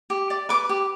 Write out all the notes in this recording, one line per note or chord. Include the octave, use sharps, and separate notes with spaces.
G4
D5
B4 D6
G4